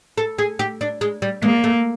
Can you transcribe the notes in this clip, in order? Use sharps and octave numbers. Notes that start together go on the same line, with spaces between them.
A4
G#4
G4
D4
G#3
G3
G#3 A#3
A3